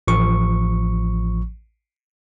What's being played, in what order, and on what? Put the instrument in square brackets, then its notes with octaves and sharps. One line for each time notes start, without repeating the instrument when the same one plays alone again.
[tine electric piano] A1 F3 C#6